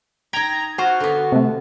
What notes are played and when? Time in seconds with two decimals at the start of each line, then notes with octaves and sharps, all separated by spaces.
0.33 D#4 G5 A#5 G#6
0.78 F4 F#4 C5
1.00 D3 B3
1.32 C3 A3